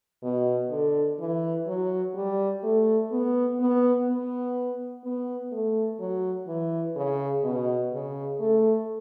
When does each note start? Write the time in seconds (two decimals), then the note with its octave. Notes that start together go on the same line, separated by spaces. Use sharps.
0.23 B2
0.70 D3
1.19 E3
1.67 F#3
2.15 G3
2.63 A3
3.11 B3
3.59 B3
4.07 B3
5.04 B3
5.52 A3
5.99 F#3
6.47 E3
6.96 C#3
7.44 B2
7.92 C#3
8.40 A3